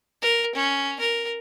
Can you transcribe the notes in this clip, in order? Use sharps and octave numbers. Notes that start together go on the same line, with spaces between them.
A#4
C#4
A#4